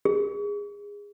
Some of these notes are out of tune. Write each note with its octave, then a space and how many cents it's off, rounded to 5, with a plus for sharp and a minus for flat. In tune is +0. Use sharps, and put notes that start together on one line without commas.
G#4 -25